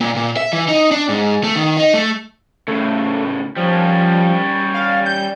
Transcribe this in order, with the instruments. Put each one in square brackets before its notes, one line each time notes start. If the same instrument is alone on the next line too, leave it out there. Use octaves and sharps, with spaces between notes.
[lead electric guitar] A#2
A#2
E5
E3
D#4
D4
G#2
A3
D#3
D#4
A3
[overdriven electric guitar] A2 C#3 [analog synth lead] A3
[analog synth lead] F3 [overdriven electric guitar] G3 C#4
[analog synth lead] F5
G6